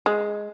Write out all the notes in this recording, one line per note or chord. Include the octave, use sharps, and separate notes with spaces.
G#3